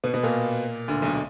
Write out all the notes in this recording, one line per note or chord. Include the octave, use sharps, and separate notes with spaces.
B2 B3
B2 B3
A#2 A#3
D2 D3
B1 B2